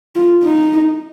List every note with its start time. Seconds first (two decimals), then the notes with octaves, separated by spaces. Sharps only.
0.15 F4
0.43 D#4